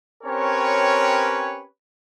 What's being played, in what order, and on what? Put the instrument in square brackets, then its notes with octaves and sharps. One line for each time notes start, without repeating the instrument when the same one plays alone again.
[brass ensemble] C4 C#4 G4 A#4 B4 C#5